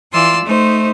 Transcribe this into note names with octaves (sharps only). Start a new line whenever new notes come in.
E3 F4 D5 C6 E6
A3 D#4 C5